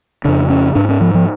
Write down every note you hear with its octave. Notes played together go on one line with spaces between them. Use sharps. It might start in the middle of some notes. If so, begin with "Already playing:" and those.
F2 C#3 D4
C#4
G#2 D4
C#4
F3
F3